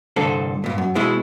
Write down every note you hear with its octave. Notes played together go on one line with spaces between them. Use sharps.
C2 G2 D3 A4 C5
G2 A#2
F#2
B2 G#3 E4